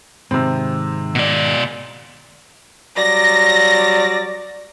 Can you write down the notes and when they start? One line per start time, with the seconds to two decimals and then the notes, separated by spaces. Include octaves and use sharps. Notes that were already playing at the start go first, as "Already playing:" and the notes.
0.31 G#2 C3 D#3 C4
1.15 B2 D5
2.97 F#3 G3 D5 A#6